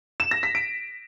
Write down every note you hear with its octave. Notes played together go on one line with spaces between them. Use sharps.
E7
A#6
B6
D7